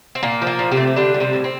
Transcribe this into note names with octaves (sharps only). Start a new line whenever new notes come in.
C4
A#2 A#3
F3
A#3
A#2
C3 C4
A3
C4
D3 G3 D4
G3
C3 C4
A2
C4